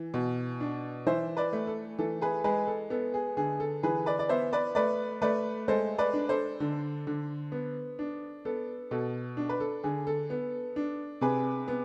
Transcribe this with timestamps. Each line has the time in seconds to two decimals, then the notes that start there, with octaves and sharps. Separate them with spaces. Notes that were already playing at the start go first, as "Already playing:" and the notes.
Already playing: E3
0.14 B2
0.61 D4
1.06 E3 C5 E5
1.37 B4 D5
1.53 A3
1.67 A4
1.99 E3 A4
2.21 G#4 B4
2.44 G#3 G#4 B4
2.67 A4
2.90 B3 A4
3.14 G#4
3.37 D3 G#4
3.60 A4
3.83 E3 G#4 B4
4.06 B4 D5
4.19 D5
4.29 B3 C5 E5
4.53 B4 D5
4.75 A3 B4 D5
5.22 A3 B4 D5
5.68 G#3 A4 C5
5.98 B4 D5
6.13 D4
6.29 A4 C5
6.60 D3
7.07 D3
7.52 B3
7.99 D4
8.45 B3 A4
8.91 B2 A4
9.37 D4
9.49 B4
9.60 A4
9.83 D3 G#4
10.07 A4
10.30 B3
10.76 D4
11.21 C3 G#4 B4
11.68 B3